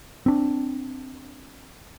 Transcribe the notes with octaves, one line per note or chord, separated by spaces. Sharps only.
C4 D4